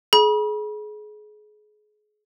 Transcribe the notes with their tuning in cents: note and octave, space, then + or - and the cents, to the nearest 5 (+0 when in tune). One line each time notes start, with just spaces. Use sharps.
G#4 +30 B5 -40